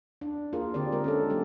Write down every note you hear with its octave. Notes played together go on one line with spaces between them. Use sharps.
D4
A#3 F4 G#4 A#4
D3 C4 G4 D5
G#3 A#4
C#4 D4 A4
F#3 A#3 G4